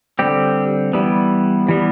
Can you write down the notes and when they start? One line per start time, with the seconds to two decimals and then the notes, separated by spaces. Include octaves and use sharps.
0.19 D3 G3 C4 G4
0.93 E3 G3 B3
1.69 E3 G3 B3